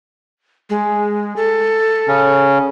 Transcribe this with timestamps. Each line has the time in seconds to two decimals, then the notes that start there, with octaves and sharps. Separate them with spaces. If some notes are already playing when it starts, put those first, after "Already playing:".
0.70 G#3
1.36 A4
2.08 C#3 C#4